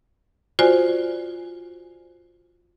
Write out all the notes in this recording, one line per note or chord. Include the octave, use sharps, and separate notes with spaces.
F4 F#4 C5 D5 G#5